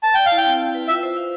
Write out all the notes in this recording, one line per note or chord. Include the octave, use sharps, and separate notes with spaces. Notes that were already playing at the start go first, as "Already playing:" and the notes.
B4 A5
D5 G5
F5
E4
G5
C4
E4
B4
F4 E5
C5
F5